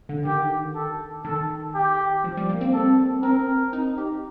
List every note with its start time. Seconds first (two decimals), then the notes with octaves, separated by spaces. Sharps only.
0.09 D3
0.25 D#3 G4
0.75 A4
1.24 D#3 A4
1.75 G4
2.24 F3
2.37 G3
2.49 A#3
2.61 C4
2.74 A4
3.23 C4 A#4
3.73 D#4
3.98 G4